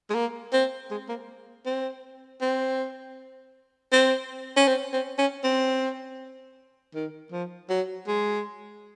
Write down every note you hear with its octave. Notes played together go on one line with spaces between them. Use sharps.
G#3
A#3
C4
G#3
A#3
C4
C4
C4
C#4
C4
C4
C#4
C4
D#3
F3
F#3
G#3